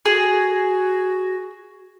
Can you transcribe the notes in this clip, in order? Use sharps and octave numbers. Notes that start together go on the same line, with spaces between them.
F#4 G#4